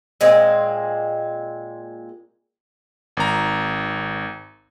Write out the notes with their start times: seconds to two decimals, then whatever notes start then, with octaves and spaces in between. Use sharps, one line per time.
0.21 A#2 G#3 C4
3.17 G#1 A#5